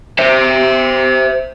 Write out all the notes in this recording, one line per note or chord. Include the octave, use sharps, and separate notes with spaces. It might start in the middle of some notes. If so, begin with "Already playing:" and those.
C5 E5